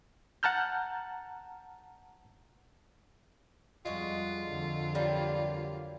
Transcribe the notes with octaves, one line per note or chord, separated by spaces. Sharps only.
F#5 A5 A#5 F6 G6
F2 G3 G#3 F4 F#4
F2 D3
F#3 G3 A#3